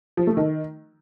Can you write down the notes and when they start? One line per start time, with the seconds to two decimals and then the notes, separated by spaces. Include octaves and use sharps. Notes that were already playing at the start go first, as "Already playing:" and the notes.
0.17 F3
0.27 A3
0.37 D#3